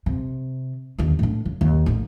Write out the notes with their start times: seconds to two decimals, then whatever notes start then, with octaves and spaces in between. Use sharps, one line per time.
0.06 C3
0.98 D#2 D3
1.19 A2 D4
1.45 C#3
1.61 D#2
1.86 A1 D#4